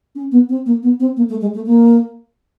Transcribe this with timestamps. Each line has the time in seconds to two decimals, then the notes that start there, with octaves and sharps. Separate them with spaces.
0.15 C#4
0.32 B3
0.49 C4
0.66 A#3
0.83 B3
1.00 C4
1.17 A#3
1.29 A3
1.41 G#3
1.55 A3
1.66 A#3